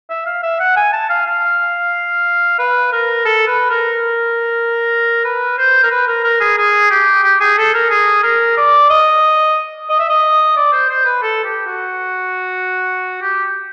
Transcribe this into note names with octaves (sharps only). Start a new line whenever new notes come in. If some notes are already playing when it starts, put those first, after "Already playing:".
E5
F5
E5
F#5
G#5
A5
F5
F5
B4
A#4
A4
B4
A#4
B4
C5
A#4
B4
A#4
A#4
G#4
G#4
G4
G4
G#4
A4
A#4
G#4
A#4
D5
D#5
D#5
E5
D#5
D5
C5
C5
B4
A4
G4
F#4
G4